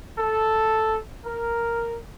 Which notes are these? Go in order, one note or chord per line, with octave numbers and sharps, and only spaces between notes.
A4
A#4